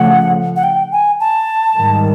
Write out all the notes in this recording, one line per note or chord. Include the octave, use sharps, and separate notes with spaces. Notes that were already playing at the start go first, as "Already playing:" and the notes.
Already playing: C#3 F3 A3 F#5
F#5
G5
G#5
A5
G#2 D#3 G3